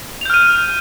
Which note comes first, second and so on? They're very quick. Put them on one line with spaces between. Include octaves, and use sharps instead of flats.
F7 G6 F6 D#7